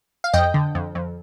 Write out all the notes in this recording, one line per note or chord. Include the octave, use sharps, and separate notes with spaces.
F5
F2 D#5 G5
D3
F2
F2